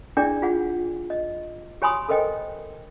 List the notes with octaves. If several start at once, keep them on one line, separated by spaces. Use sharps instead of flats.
D4 E4 G#4 D5 G5
F4 G#4 F#5
D#5
G4 C#5 G#5 B5 C6 D#6
A4 A#4 C5 D#5 G5